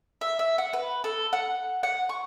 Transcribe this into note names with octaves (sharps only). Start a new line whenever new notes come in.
E5
E5
F#5
B4
A4
F#5
F#5
C#6